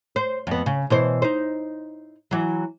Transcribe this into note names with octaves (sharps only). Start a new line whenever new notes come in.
C5
F2 B3
C#3
B2 E3 C5
D#4 C5
E3 F#3